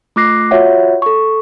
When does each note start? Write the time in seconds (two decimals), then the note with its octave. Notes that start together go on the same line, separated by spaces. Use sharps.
0.16 A3 F4 D6 F#6 A#6 C7
0.51 F4 F#4 C#5 E5 F#5
1.02 A4 C#6